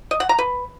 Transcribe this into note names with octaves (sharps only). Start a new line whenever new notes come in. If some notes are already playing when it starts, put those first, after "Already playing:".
D#5
F#5
A#5
B4